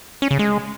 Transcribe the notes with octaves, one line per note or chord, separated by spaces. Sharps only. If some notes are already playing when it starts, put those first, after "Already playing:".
C#4
C#3
G#3